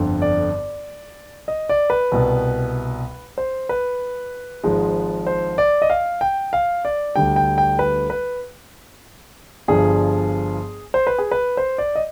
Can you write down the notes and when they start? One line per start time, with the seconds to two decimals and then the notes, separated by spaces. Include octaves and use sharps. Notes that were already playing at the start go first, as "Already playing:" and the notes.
Already playing: G1 F2 D3
0.22 D5
1.48 D#5
1.69 D5
1.90 B4
2.11 C2 B2 B3
3.38 C5
3.69 B4
4.63 G#1 G#2 F3 G#3
5.27 C5
5.58 D5
5.82 D#5
5.90 F5
6.21 G5
6.53 F5
6.85 D5
7.15 D2 D3 G3 G5
7.36 G5
7.58 G5
7.79 B4
8.10 B4
9.68 G1 G2 F3 G#4
10.94 C5
11.07 B4
11.18 G#4
11.31 B4
11.57 C5
11.78 D5
11.96 D#5